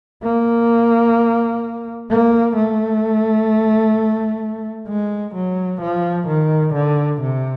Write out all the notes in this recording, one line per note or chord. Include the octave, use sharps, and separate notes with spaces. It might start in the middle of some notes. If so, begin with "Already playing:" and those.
A#3
A#3
A3
G#3
F#3
F3
D#3
D3
C3